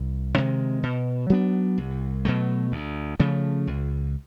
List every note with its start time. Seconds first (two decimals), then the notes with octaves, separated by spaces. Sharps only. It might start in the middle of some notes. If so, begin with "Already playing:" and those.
Already playing: C2
0.36 C3 D#3 G#3
0.83 B2
1.30 F#3 B3 D4
1.78 C2
2.25 B2 F#3 A3
2.72 D2
3.20 C#3 F3 A3
3.67 C#2